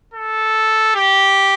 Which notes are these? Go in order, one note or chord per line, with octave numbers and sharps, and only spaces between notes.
A4
G4